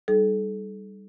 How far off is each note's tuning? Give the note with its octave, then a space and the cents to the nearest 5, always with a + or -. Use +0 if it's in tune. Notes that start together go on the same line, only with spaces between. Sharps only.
G3 +0 D#4 +0 A4 -40